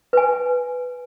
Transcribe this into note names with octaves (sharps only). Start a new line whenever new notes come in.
B4 G#5